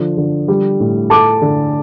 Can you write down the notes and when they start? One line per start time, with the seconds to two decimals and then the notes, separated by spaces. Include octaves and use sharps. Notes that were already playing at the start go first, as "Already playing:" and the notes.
Already playing: D3 F3
0.17 D3
0.48 G3
0.80 A2
1.10 A3 A5 D6
1.42 D3